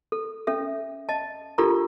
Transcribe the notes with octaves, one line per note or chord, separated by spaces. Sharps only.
A4
C#4 A4 E5
D#5 A5
D4 F4 G4 A4 A#4 A#5